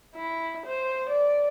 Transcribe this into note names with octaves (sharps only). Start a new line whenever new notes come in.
E4
C5
D5